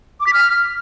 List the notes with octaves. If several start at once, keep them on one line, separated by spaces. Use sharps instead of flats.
D6
B6
F6